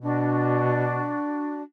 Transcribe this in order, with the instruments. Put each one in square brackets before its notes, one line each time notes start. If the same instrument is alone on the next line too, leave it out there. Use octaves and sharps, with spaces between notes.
[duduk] B2 [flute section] D4 F#4